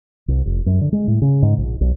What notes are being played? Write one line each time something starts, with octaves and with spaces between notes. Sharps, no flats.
C2
F1
F#2
D3
G#3
A2
C#3
G#2
A#1
B1